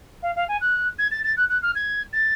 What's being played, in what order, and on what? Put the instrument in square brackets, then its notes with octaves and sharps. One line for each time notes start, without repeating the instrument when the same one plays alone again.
[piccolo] F5
F5
G#5
F#6
G#6
A6
A6
F#6
F#6
F6
G#6
A6